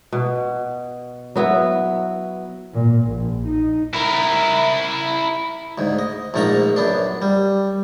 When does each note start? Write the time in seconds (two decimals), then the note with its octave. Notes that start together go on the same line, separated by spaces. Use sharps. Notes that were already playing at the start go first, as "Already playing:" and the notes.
0.12 B2
1.36 F#3 B3 E4
2.74 A#2
3.10 A#1
3.47 D#4
3.94 E4 A#4
5.78 D2 G#2
5.99 D#5
6.34 A#1 G#2 A3 A#3 A#5
6.76 F#2 B3 D4
7.22 G3